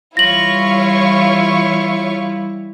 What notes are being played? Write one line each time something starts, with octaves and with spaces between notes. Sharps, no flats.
E3 G3 E4 F4 C#5 C#6 A#6 F#7